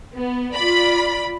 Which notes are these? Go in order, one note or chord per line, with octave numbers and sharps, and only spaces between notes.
B3
F4 D5 B5